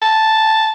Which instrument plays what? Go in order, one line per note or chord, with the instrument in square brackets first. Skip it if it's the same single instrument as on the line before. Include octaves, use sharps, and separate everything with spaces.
[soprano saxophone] A5